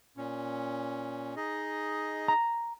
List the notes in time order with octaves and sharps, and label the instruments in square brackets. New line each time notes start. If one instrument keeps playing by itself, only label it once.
[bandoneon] A#2 C#4
D#4 G#4 D#5
[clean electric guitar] A#5